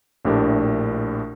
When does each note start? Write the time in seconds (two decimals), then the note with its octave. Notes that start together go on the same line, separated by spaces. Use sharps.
0.25 A#1 A2 D4 G4 A#4